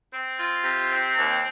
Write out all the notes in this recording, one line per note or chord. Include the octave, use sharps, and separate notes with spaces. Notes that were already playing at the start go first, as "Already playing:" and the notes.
C4
F4
C3
C4
D#2